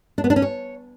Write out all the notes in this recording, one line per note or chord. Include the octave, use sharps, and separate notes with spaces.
D4
B3
D4
C#4
C#5